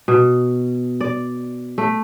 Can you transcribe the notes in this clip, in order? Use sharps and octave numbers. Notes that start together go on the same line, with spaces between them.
B2
D5
A3